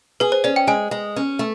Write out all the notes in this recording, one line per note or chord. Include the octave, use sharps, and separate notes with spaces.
G#4 B4
C5
C#4 D5
G5
G#3 G#5
G#3
C#4
A3